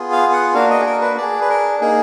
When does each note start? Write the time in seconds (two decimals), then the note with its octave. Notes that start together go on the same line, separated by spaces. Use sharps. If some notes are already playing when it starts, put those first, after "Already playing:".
Already playing: B3 F4 G#4
0.12 F5
0.33 F#5
0.54 A#3 D4 F#4 F5
0.70 D#5
0.80 G#4
0.86 A#4
1.01 B4
1.17 D4 G#4 D5
1.41 B4
1.49 A#4
1.80 A#3 D#4 G#4